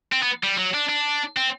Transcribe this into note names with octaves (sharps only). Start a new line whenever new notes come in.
C4
B3
G3
F#3
D4
D4
C4